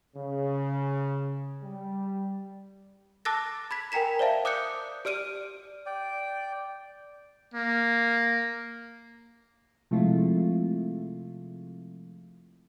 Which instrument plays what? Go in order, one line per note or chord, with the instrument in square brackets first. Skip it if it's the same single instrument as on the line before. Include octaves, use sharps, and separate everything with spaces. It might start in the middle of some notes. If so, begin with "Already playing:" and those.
[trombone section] C#3
G3
[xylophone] A5 D6 E6 F#6 A6 A#6
B5 G#6 B6
A#4 G5 G#5 A#5 B6 E7
C5 D5 E5 F5 A5
D6 D#6 F#6 G6 C#7
G4 D5 F6 D7 D#7
[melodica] D5 G5
[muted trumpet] A#3
[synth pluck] C3 F3 G#3 A3 E4 F4